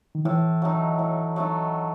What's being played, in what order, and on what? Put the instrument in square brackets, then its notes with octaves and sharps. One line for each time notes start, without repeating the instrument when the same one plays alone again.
[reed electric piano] D#3
[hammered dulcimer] A2 [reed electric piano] E3
[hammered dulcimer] F#3 A3 D#4
A2
F#3 A3 D#4